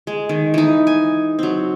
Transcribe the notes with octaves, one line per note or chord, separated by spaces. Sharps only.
G#3
D#3
E3 D#4
G#5
F#3 C4